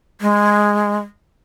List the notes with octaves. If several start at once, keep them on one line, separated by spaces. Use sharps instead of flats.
G#3